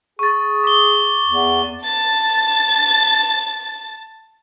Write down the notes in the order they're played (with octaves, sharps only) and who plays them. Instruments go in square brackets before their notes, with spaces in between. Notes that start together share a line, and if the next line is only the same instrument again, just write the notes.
[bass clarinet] G#4 [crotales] C#6 A6
[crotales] D6 G7
[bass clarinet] E2
[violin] A5 A6